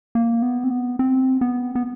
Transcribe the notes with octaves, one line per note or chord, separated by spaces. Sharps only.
A#3
B3
C4
B3
C4
B3
B3